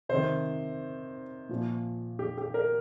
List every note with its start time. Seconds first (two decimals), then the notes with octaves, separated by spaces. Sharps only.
0.09 C3 D#3 C5
1.49 A#2 F3
2.19 G4
2.38 G4
2.54 A#4